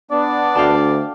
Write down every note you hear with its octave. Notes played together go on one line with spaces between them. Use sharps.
B3 D4 D5
D2 F5 G5 A5